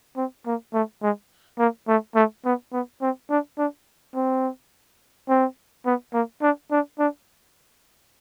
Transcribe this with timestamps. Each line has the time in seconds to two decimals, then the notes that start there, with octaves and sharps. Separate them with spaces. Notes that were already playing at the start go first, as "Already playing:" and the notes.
0.17 C4
0.46 A#3
0.74 A3
1.02 G#3
1.59 A#3
1.88 A3
2.15 A3
2.45 B3
2.72 B3
3.02 C4
3.30 D4
3.58 D4
4.15 C4
5.28 C4
5.86 B3
6.14 A#3
6.42 D4
6.71 D4
6.99 D4